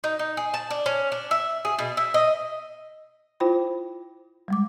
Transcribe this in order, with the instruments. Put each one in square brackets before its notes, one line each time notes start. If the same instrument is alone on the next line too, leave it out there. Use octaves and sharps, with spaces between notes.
[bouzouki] D#4
D#4
G#4
A5
D4
C#4
D4
E5
G#4
B2
E5
D#5
[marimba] E4 F4 C5 G5 B5
G3 G#3 D6